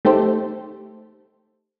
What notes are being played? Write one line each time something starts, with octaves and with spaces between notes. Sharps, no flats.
A3 D#4 G4 A4 C5